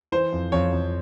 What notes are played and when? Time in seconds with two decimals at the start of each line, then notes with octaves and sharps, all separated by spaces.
0.12 E3 C5
0.32 F2
0.52 F2 C#5
0.72 F2